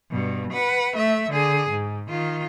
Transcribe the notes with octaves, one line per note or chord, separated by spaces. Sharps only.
G2 B2
B4 F#5
A3 E5
D3 G#4
G#2
D#3 F4